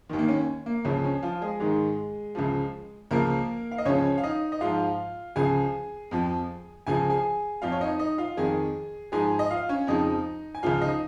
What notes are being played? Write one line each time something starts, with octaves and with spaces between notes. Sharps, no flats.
D#2 D#3
A#3
C#4
A#3
C#2 C#3 F3 C#4
C#4
F3 F4
G#3 G#4
G#2 D#3 G#3 G#4
C#2 C#3 F3
C#2 C#3 F3 A#3 A#4
F5
D#5
C#2 C#3 F3 C#4 C#5
F5
D#4 D#5
D#5
G#2 F3 F4 F5
C#2 C#3 F3 G#4 G#5
F2 F3
C#2 C#3 F3 G#5
G#4 G#5
F2 F3 F4 F5
C#5
D#4 D#5
D#4 D#5
F4 F5
F2 D#3 G#4 G#5
G#2 F3 G#4 G#5
D#5
F4 F5
C#4 C#5
F2 C#3 F3 D#4 D#5
G#5
C#2 C#3 F3 F4 F5
D#4 D#5